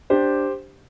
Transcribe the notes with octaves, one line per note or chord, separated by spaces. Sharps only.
D4 G4 C5